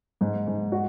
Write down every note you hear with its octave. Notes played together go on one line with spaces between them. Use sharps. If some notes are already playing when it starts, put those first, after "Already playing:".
G#2
G#2
F#4